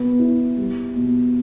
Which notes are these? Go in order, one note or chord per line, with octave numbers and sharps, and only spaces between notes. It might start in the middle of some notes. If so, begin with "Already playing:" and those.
Already playing: B2 B3
E4
G3
B2